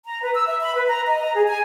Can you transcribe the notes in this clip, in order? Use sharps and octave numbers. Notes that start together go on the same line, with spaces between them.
A#5
B4
E6
E5
B5
B4
A#5
D#5
A#5
G#4
G#5